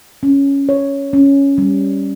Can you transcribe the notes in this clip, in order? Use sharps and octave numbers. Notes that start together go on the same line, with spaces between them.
C#4
C#5
C#4
G3